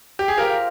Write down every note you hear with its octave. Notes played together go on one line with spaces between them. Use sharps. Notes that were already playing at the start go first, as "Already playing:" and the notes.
G4
G#4
F4 G4 A#4 C5 F5